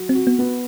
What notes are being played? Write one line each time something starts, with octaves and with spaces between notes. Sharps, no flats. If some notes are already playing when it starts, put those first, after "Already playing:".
Already playing: F#3
C4
F#4
B3
B3